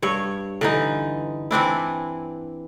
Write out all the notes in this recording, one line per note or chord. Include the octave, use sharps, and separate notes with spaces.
G2 C#5
D3 E3 D#4
E3 C4 D4 E4